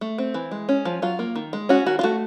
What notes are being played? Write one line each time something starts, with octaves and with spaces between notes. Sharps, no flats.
A3
C4
E3
G#3
C#4
F3
F#3 F4
A#3
D#3
G#3
C#4 F#4
D#3 F#4
F4
A3 F#4